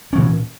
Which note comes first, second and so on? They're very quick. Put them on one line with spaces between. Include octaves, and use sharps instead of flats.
C#4 E3 A#2